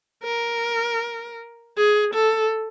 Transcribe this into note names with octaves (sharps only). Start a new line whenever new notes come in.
A#4
G#4
A4